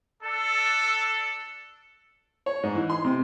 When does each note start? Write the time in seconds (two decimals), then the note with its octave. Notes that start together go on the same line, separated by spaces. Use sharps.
0.22 D4 A4
2.46 C#5
2.63 G#2
2.75 E3
2.90 C6
3.04 C3